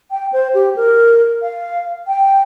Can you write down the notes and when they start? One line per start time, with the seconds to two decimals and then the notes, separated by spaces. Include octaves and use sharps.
0.11 G5
0.33 C5
0.54 G4
0.76 A#4
1.42 F5
2.07 G5